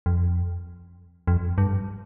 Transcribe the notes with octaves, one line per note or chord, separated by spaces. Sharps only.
F2
F2
G2